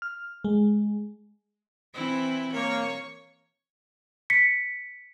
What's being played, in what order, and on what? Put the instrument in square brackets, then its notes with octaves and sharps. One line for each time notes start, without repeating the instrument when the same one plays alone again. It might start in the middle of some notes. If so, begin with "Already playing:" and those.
[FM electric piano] F6
G#3
[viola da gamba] E3 C4 E4
[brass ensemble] A#3 [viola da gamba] C#5
[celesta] B6 C#7